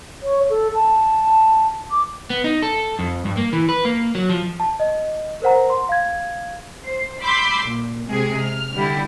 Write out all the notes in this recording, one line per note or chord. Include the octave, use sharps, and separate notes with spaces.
C#5
A4
A5
D6
B3
D#4
A4
F2
G2
A#3
E3
B4
A#3
F#3
F3
A5
D#5
A#4 C5 F#5 A#5
C6
F5 G#6
C5
B5 C6 D6 E6 G6 C7
A#2
C3 G#3 G#4
F6
D3 G3 E4